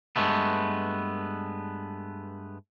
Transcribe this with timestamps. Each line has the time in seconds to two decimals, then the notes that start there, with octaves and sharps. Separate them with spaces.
0.16 G2 G#3 A3 B3